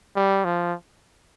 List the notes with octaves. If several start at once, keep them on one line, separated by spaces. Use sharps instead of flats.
G3
F3